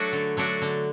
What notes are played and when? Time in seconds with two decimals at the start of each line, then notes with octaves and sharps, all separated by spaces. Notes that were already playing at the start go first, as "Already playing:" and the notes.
Already playing: F#3 A3 D4 F#4
0.13 D3
0.37 F#3 A3 D4 F#4
0.62 D3